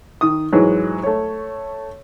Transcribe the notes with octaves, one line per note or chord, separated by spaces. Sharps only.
D#3 D#6
G#2 E3 F#3 G#3
A3 C#5